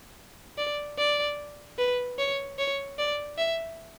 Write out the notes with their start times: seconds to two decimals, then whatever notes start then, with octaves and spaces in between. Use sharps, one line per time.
0.58 D5
0.98 D5
1.79 B4
2.19 C#5
2.59 C#5
2.99 D5
3.38 E5